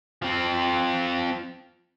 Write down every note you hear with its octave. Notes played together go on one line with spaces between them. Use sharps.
F3 C4